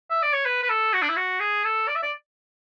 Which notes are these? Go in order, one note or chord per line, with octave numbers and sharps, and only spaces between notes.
E5
D5
C#5
B4
B4
A4
F#4
D4
E4
F#4
G#4
A4
D5
E5
D5